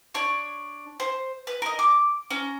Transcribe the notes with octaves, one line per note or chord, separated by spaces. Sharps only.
D4 C#5 C#6
C5
B4
A#4 D#5
D6
C#4 A#5